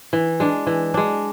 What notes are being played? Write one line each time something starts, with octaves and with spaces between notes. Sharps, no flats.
E3
G#3 D4
E3
G#3 D4